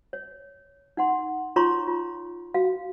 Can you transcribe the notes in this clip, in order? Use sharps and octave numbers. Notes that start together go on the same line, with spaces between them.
C#5
D#4 F#5 C6
D#4 F4 C#5 A#5 C6 C#6
F4
F#4 F5